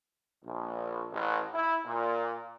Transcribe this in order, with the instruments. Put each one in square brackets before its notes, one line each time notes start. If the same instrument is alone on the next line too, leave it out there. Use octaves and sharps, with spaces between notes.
[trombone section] A#1
A1
E4
A#2